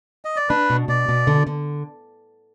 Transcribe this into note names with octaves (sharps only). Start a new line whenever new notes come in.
D#5
D5
D4 B4
B2
B2 D5
B2
D3
D3